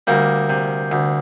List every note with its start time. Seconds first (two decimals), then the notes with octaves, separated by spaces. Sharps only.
0.07 D2 G3 A#3
0.49 C3
0.92 D2